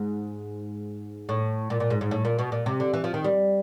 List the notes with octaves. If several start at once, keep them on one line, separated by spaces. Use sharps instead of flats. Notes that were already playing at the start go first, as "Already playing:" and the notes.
Already playing: G#2
A2
A#2
A#2
G#2
G#2
A2
A#2
B2
A#2
C3
D3
E3
F3
D#3
G3